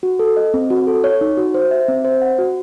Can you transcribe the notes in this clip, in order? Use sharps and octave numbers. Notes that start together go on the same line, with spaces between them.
F#4
A4
D#5
C4
F#4
A4
C#5
D#4
F#4
C5
E5
C4
C5
F#5
F#4